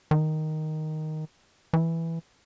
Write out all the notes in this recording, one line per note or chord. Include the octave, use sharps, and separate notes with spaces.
D#3
E3